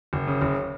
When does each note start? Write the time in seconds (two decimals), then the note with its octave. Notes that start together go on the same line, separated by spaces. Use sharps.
0.13 F#1
0.27 C#3
0.41 F#1